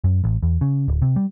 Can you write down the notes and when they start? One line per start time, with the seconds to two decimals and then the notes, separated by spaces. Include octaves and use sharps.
0.04 F#2
0.24 A1
0.43 E2
0.61 C#3
0.88 D1
1.02 C3
1.16 G3